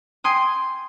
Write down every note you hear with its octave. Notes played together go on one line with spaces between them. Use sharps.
G5 G#5 C6 D#6